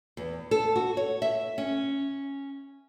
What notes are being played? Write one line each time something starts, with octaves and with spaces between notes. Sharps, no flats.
E2
A4
F#4
C#5
E5
C#4